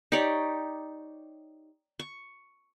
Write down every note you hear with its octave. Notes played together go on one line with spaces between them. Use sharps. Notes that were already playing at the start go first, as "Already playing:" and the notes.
D#4 G4 C#5 D5
C#6